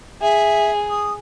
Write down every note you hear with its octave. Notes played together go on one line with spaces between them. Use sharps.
G#4 E5
D#6